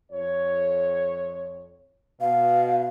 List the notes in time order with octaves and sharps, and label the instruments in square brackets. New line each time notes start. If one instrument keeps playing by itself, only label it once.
[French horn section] F2 C#5
[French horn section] B2 [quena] F5